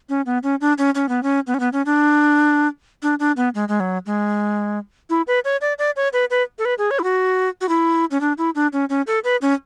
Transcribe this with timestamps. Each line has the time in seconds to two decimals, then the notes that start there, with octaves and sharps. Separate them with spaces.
0.09 C#4
0.26 B3
0.43 C#4
0.61 D4
0.78 C#4
0.95 C#4
1.09 B3
1.23 C#4
1.47 B3
1.54 C#4
1.60 B3
1.73 C#4
1.86 D4
3.02 D4
3.20 D4
3.37 B3
3.55 G#3
3.68 G#3
3.80 F#3
4.06 G#3
5.10 E4
5.27 B4
5.45 C#5
5.61 D5
5.78 D5
5.96 C#5
6.13 B4
6.30 B4
6.59 A4
6.65 B4
6.78 G#4
6.91 C#5
6.99 E4
7.04 F#4
7.61 F#4
7.69 E4
8.11 C#4
8.21 D4
8.38 E4
8.55 D4
8.73 C#4
8.89 C#4
9.07 A4
9.24 B4
9.42 C#4